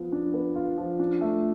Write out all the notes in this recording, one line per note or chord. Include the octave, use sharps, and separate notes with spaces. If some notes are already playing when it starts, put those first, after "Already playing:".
Already playing: F3 B3 F4
D4
B3
F4
F3
D4
A3